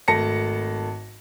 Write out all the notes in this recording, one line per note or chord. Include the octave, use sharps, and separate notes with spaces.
G#1 A3 A5 A#6 C#7